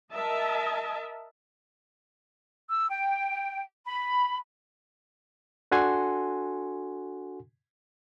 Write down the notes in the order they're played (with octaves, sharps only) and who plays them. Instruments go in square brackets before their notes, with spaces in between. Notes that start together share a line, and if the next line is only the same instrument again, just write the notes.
[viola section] A#4 D#5 E5 A5
[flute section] E6
G5
B5
[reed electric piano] D4 F#4 A4 F#5 G#5 C6